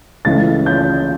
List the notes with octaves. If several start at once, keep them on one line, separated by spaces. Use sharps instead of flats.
C#2 C#3 E3 A3 A6
G6